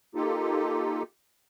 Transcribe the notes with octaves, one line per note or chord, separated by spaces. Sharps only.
A#3 D#4 F4 G4 A4